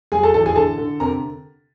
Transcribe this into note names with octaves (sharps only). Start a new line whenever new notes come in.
F#3 G#4 G#5
A4 A5
A1 A4 A5
G#4 G#5
D3 A4 A5
D3
C3 A#4 A#5